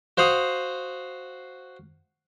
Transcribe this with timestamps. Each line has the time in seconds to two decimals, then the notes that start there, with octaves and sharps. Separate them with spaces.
0.17 F#4 C5 F5 F#5 D#6